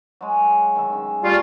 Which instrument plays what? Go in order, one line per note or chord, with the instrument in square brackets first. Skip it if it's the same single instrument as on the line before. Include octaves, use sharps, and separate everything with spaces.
[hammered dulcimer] F#3 G#3
D#3 E5
C#3
[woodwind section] G3 F4 [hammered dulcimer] A3 G5